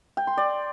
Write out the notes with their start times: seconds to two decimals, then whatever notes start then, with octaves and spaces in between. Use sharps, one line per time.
0.17 G5
0.27 C6
0.37 D5